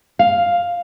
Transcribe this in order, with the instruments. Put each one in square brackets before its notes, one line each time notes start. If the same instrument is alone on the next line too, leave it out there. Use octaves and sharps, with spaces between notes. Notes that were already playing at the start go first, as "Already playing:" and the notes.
[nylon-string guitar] F5